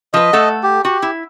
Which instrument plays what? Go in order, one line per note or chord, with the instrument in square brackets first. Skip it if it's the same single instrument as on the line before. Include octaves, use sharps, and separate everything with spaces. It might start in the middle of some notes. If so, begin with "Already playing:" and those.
[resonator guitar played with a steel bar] F3 B4 [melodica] D#5
[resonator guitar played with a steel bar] A3 A4 F#5
[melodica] G4
[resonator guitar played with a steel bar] F#4 [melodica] G4
[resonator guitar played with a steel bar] E4